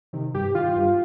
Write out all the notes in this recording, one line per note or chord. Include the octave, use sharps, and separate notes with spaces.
C3 D#3
G2 G4
D#3 F4
G2